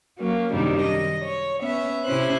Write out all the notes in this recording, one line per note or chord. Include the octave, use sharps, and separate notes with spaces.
F#3 A#3 C#4
F#2 C3 D#3 G3 D4 D#4
D#5
C#5
B3 C#4 E5
C3 C#4 E4 C5 F#6